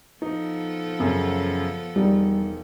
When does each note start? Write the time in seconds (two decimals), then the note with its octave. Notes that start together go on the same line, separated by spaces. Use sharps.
0.22 F3 B3 D#4 A4
0.99 F#2 C#3
1.96 E1 G3 D#4